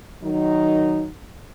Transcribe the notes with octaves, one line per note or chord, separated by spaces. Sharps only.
D#3 F#3 D#4